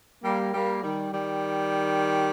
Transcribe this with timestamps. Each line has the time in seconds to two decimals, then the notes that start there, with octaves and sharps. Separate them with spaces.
0.24 G3 A#3
0.54 G3 A#3
0.83 D#3 G3
1.14 D#3 G3